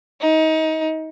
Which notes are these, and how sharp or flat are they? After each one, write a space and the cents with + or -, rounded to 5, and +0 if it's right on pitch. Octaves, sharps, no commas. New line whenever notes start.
D#4 +25